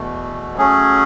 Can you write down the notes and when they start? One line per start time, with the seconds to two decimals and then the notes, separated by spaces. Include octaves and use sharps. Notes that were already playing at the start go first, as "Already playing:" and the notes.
Already playing: E2 B2 A3
0.57 F#3 A3 C#4 G#4